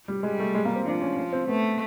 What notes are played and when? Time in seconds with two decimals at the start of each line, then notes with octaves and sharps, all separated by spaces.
0.08 G3
0.23 G3 G#3
0.40 A3
0.55 G#3
0.65 A#3
0.76 C4
0.85 F3 D4
1.02 C#4
1.17 C#4
1.33 C4
1.48 A3 B3